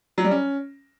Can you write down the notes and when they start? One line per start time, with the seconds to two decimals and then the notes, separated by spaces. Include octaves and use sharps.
0.18 F#3
0.24 G3
0.31 C#4